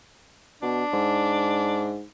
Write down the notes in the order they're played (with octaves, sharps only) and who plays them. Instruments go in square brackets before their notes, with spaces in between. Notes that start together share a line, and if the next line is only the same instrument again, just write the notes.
[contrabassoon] B2 [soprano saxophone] D4
[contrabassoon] G#2